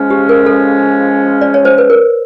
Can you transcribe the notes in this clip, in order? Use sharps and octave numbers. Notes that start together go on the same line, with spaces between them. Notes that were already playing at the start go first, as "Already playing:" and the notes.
Already playing: C#3 F3 G#3 C#4
G4
A#4
A4
D5
C#5
C5
B4
A#4